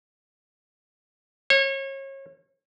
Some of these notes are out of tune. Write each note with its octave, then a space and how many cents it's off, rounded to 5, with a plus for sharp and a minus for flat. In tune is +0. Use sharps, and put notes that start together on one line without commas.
C#5 -30